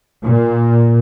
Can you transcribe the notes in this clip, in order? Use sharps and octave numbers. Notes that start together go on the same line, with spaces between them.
A#2